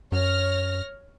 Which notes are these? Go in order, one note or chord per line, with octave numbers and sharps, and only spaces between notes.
F#2 C#5 F6 A#6